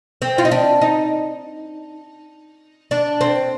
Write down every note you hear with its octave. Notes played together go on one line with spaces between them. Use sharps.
C4
F4
D#4
D4
D#4
D4
C4